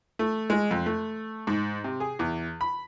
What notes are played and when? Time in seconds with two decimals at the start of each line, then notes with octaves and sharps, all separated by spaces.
0.19 A3
0.50 G#3
0.71 F2
0.86 A3
1.47 G#2
1.84 C3
2.00 G#4
2.19 E2
2.61 B5